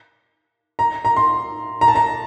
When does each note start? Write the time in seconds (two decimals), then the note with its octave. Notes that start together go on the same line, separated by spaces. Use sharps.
0.79 A#5
1.05 A#5
1.16 C6
1.81 A#5
1.88 A5
1.95 A#5